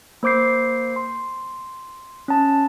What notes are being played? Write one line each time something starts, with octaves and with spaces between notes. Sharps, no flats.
A#3 C5 D6 G6 C7
C6
C#4 A5